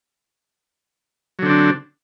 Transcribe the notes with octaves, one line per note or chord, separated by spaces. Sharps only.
D3 F#3 C4 D4